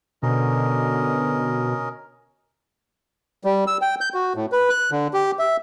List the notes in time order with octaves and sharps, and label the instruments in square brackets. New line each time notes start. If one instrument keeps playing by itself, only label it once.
[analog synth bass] B2 [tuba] D3 [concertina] C#4 A#4 D#5
[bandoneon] G3
E6
G5
G6
F#4
A2
B4
F#6
D3
G4
E5